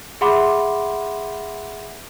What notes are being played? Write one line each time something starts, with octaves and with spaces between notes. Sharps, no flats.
G#4 E5 F#5 B5 C6 D6